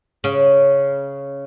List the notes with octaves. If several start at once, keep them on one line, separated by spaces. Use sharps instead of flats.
C#3